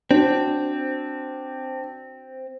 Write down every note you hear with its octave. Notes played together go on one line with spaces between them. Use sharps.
C4 D4 F#4 C5